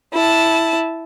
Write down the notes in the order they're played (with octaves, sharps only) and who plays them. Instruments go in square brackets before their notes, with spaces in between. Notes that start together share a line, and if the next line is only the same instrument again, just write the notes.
[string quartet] E4 A5